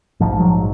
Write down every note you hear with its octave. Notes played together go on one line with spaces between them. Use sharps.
A#1 G#2 F3
F#3